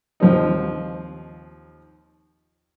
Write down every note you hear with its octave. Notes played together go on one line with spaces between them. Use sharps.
D#2 F3 C4 D#4